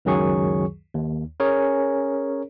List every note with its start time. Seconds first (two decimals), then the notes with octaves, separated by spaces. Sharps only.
0.05 C#2 F#2 D#3 F#3 G#4 C#6
0.94 D#2
1.40 C#4 G#4 A#4 C#5